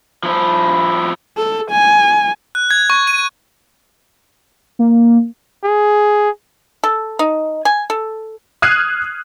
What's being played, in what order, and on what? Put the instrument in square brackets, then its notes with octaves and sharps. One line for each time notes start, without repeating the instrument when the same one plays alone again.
[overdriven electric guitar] F3 E4
[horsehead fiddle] A4
G#5
[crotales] F#6
G#6
C#6
D#7
[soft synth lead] A#3
[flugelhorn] G#4
[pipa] A4
D#4
G#5
A4
[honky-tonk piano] D#6 F6 F#6 G#6 C7 D#7